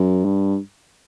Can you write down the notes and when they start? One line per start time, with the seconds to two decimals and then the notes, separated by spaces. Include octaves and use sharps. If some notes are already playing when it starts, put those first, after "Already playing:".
Already playing: F#2
0.25 G2